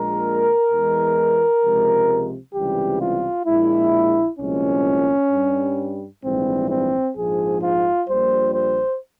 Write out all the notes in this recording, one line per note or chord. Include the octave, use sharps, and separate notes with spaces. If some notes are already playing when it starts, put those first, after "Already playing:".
Already playing: A#1 A#2 G#3 A#4
E2 E3 G#3
C#2 C3 F3 G#3
C#2 C3 E3 G3 G4
F4
A#1 A#2 G#3 E4
C2 A#2 F3 G#3 C#4
G2 G3
A#1 G#2 E3 G3 C4
C4
A#1 G#2 F3 G#3 G#4
F4
A#1 A#2 G3 C5
C5